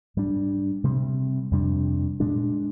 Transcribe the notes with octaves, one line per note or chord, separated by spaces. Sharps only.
G#2 G3 D4
C3 G3 C4
F2 C3 G3 D4
A#2 G#3 D4